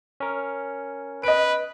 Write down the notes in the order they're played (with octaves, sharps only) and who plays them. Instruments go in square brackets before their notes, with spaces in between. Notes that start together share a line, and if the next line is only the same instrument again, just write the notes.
[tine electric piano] C#4 A#4
[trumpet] B4 [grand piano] D#5 D7